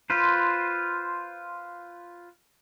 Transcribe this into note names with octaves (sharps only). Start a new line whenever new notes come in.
F4 B4 C5